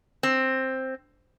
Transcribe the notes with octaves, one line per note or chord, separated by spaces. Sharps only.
C4